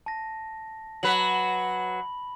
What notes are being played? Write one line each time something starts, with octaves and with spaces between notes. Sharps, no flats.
A5 A#6
F#3 B4 B5 F#7